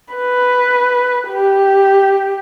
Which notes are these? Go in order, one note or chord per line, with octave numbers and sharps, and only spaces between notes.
B4
G4